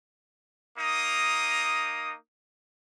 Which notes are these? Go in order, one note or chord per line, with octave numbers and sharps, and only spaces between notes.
A#3 D#4 D#6